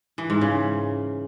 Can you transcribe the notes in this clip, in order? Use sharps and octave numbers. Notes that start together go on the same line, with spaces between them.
E3
G#2
C#3